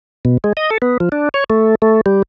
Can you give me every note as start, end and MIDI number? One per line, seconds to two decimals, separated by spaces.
0.25 0.38 47
0.44 0.53 56
0.57 0.70 75
0.71 0.78 69
0.82 0.97 59
1.00 1.09 53
1.12 1.29 62
1.34 1.44 73
1.50 1.75 57
1.82 2.01 57
2.06 2.22 55